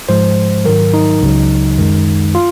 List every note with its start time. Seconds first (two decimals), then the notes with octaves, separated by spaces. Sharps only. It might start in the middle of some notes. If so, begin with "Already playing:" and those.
0.09 G#2 F3 G#3 C5
0.65 G#2 D#3 F#3 A#4
0.94 D#4
1.22 C#2 C#3 F#3
1.78 F#2 D#3 G#3
2.35 F4